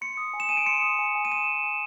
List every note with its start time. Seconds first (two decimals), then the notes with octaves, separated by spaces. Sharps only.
0.01 C6 C#7
0.17 D#6
0.34 G#5
0.40 E7
0.49 G#5 D#7
0.57 D7
0.66 C6 C#7
0.82 D#6
0.99 G#5
1.15 G#5
1.25 D#7
1.32 C6 E7
1.48 D#6
1.64 G#5